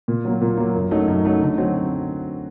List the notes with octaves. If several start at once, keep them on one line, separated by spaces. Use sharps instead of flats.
A#2
F#3 A#3
A#2
F#3 A#3
F#2
F#3 A3 D#4
F#2
F#3 A3 D#4
D3
F#3 C4 F#4